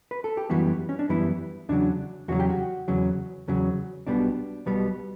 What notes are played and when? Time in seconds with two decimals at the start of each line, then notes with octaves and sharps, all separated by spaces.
0.11 B4
0.24 A4
0.37 G4
0.50 F#2 E3 G3 B3 F#4
0.89 C#4
0.99 D4
1.09 F#2 E3 G3 B3 E4
1.69 E2 C#3 F#3 D4
2.28 E2 C#3 F#3 F#4
2.40 G4
2.50 F#4
2.88 E2 C#3 F#3
3.48 E2 C#3 F#3
4.07 B1 B2 G3 B3 D4
4.66 B1 B2 G3 B3